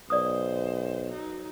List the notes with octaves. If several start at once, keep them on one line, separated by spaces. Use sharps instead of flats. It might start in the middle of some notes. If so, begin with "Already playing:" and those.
B1 C5 D5 D#6
F#3 D#4